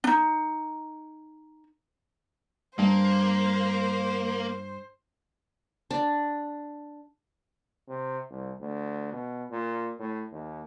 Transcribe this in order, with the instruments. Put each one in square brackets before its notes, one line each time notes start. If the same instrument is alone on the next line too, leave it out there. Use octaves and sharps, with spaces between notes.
[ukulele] D4 D#4
[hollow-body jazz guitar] G2 [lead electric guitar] A#3 [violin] C5
[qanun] D4
[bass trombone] C3
C2
D2
B2
A#2
A2
D#2